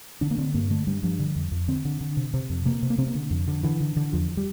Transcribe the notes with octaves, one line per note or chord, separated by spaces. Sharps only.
D3 D4
A#3
D3 C4
G2 A#3
D3 A3
G2 G3
G2 F3
D3
F2
F2
D3 C4
D3
D3
C3
C3
F2
C3 A#3
C3
A#3
C3 C4
A#3
D3
F2
D3
D3 E3
D3
D3
E2 F3
G3